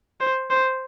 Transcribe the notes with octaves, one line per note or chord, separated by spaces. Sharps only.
C5
C5